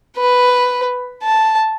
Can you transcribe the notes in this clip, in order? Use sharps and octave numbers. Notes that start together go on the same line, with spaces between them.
B4
A5